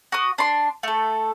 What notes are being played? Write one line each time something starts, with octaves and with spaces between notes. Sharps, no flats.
F#4 D#6
D4 C6
A3 A4